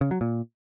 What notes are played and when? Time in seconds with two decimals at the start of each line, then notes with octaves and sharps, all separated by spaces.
0.01 C#3
0.11 F#3
0.21 A#2